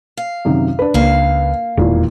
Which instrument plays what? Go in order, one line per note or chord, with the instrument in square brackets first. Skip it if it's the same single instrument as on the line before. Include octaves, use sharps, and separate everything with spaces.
[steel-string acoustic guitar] F5
[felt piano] F#2 C3 D#3
D4 B4
[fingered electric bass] C#2 [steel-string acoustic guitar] A#3 F5
[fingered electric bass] E1 [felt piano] D#2 A#2 E3